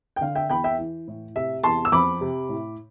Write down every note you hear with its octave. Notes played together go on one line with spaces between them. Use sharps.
G5
D3 F5
E5 G5
E2 G5 B5
E5 G5
E3
A2
C3 E5
E2 A5 C6
E6
F2 B5 D6
C3
A2